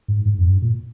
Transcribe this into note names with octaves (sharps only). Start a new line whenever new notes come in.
G#2
G#2
F2
G2
A#2